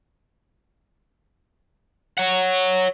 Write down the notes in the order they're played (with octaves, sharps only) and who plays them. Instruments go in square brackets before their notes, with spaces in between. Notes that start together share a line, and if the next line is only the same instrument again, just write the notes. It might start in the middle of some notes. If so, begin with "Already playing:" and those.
[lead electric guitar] C#5 F#5